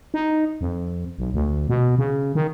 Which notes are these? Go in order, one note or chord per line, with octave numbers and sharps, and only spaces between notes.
D#4
F2
B1
D2
B2
C#3
D#3